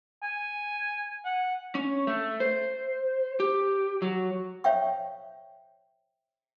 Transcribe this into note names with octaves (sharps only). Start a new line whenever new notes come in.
G#5
F#5
C#4
A3
C5
G4
F#3
C5 C#5 E5 F5 G5 C#6